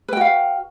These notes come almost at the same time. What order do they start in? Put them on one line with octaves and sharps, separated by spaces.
B4 G5 F#4 F5